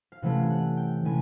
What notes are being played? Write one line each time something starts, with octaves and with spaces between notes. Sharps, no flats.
F5
C3 E3 A3 C#4 F#5
F#5
G5
C3 E3 A3 C#4 G#5